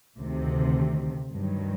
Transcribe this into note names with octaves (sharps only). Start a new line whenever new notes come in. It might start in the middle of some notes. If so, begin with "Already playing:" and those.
D2 C3 D#3
G2 D#3 F#3